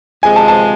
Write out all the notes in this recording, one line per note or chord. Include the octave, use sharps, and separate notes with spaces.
C3 F3 G#3 G#5
A5
A5